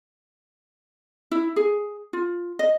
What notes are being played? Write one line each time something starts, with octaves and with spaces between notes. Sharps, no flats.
E4
G#4
F4
D#5